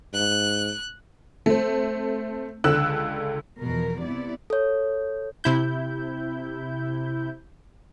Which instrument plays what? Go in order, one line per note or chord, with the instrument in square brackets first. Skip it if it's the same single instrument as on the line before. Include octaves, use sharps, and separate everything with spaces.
[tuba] G#2 [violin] F#6
[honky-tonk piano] A3 C4
C#2 D3 E6 F#6
[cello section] E2 B2 F3 A#4
C3 B3 E4 D5
[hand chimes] A4 C#5
[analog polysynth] C3 E4 G6